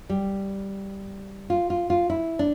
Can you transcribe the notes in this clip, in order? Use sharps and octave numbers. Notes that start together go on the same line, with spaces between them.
G3
F4
F4
F4
E4
D4